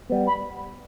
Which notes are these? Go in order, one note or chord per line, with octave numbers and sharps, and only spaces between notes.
G3 B3
B5